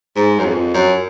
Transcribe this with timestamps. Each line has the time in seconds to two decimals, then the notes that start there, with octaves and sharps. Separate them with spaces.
0.16 G#2
0.39 F#2
0.44 F2
0.74 F#2